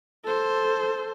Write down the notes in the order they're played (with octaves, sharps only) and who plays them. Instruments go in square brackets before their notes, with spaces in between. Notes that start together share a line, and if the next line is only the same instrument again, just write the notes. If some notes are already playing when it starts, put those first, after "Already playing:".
[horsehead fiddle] A4 C5